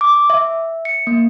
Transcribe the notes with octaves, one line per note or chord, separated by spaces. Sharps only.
D6
E5
C#7
A#3